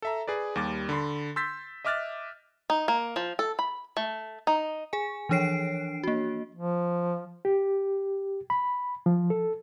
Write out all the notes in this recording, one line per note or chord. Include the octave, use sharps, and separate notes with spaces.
A4 E5 A#5
G#4 B4 D5
D#2 G3 D6 A6
D3 B5 C6
C6 E6 G6 A6 B6
D#5 E5 D6 F6 F#6 A6
D#4
A#3
F3
A4
B5
A3
D#4
G#4 G#5
E3 F3 D4 C#5 C7 D7
A#3 F#4
F3
G4
B5
F3
A4